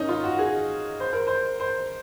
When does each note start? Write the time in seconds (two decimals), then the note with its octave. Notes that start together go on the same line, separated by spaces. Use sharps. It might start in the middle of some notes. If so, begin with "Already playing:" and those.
Already playing: C#4 D#4
0.09 F4
0.24 F#4
0.39 G#4
1.00 C5
1.13 A#4
1.27 C5
1.60 C5